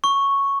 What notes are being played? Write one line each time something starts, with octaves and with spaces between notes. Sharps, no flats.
C#6